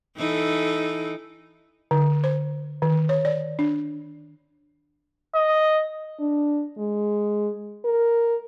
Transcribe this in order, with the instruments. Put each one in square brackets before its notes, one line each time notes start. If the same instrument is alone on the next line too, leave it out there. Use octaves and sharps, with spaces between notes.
[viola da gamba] E3 D#4 A4
[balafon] D3
C5
D#3
C#5
D5
D4
[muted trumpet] D#5
[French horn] D4
G#3
A#4